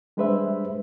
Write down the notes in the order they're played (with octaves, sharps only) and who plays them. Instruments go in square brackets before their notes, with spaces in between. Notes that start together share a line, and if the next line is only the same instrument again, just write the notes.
[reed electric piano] G3 G#3 D4 B4 C5 E5